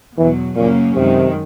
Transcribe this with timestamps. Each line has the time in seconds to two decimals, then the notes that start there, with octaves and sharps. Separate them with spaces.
0.17 E2 B2 E3 F#3
0.56 F#2 A#2 C#3 F#3 A#3 C#4
0.94 F#2 C3 D#3 G#3